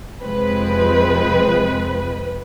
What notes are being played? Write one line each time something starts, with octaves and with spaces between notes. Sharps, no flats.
F2 C3 F3 G#3 C4 B4